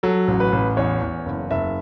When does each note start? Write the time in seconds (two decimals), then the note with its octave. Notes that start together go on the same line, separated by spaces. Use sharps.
0.03 F#3 A4
0.28 A1
0.40 B4
0.53 A1
0.77 E2 C#5
1.01 E2
1.26 F#1
1.51 F#1 E5